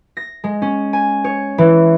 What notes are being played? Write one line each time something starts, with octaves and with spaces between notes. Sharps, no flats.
A#6
G#3
C#4
G#5
C#5
E3